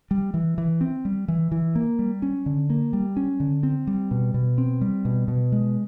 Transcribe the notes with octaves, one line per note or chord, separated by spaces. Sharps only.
G3
E3
E3
C4
G3
E3
E3
A#3
G3
C#4
D3
A#3
G3
C#4
D3
C4
G3
B2
B2
C4
G3
B2
B2
G#3